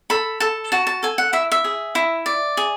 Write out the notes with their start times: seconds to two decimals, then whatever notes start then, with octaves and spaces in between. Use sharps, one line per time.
0.10 A4 B5
0.40 A4 A5
0.72 F#4 A5
0.87 A5
1.03 A4 G#5
1.18 F#5
1.33 E4 E5
1.52 E5
1.64 G#4
1.95 E4
2.26 D5
2.57 G#4